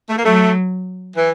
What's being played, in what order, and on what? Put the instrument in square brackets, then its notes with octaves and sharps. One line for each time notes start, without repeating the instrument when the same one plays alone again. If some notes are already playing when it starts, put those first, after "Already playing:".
[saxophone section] A3
A#3
[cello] F#3 [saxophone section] A3
[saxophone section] E3